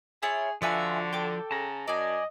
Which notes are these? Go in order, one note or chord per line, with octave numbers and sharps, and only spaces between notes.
E4 F4 G#4 C#5
D3 F3 F4 F#4 B4 E5 G#5
A4 G5 D6
C#3 A5 A#5
F#2 D5 D#5 G#5